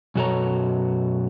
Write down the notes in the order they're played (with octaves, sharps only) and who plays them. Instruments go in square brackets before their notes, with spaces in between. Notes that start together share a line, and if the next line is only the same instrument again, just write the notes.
[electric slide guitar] F#2 B2 F#4 A4 C#5 A#5